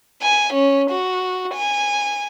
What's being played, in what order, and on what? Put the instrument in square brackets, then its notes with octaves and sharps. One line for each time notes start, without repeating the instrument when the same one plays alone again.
[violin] G#5
C#4
F#4
G#5